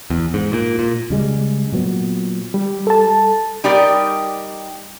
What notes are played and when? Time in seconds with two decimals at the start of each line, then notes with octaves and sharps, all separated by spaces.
0.10 E2
0.34 G#2
0.53 A#2
0.79 A#2
1.10 C#3 G3 G#3
1.72 A#2 F#3 B3
2.54 G3
2.87 A4 A5
3.64 G3 D#4 G4 A#4 D5 D#5